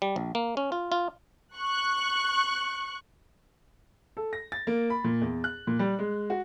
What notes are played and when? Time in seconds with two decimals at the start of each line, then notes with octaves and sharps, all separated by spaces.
0.02 G3
0.16 A#1
0.35 A#3
0.57 C#4
0.72 F4
0.92 F4
1.57 C#6 F#6
4.17 A4
4.33 A#6
4.52 A6
4.67 A#3
4.90 B5
5.04 A#2
5.21 E2
5.44 F#6
5.67 A#2
5.79 G3
5.99 G#3
6.30 F#4